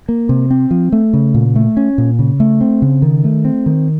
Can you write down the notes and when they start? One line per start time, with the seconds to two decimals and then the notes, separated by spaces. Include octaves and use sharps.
0.09 A#3
0.29 C3
0.51 C4
0.71 F3
0.92 A3
1.13 C#3
1.34 A#2
1.56 A3
1.77 C#4
1.98 A#2
2.19 C#3
2.40 A3
2.61 C4
2.82 C#3
3.02 D#3
3.24 A3
3.45 C4
3.66 D#3